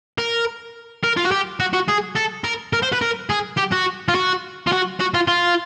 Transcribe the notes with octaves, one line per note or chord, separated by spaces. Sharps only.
A#4
A#4
F4
F#4
G4
F#4
F#4
G#4
A4
A#4
A#4
C5
B4
A#4
G#4
G4
F#4
F4
F#4
F4
F#4
F#4
F4
F4